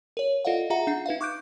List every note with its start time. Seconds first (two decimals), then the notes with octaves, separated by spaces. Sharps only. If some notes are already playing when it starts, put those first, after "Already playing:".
0.17 A#4 C#5
0.45 F4 A4 D5 D#5 F5 F#5
0.70 F4 G#4 E5 F#5 A#5
0.87 D4 F#5 C7
1.06 D#4 B4 E5 F5
1.21 C#6 D6 F#6 G6 D7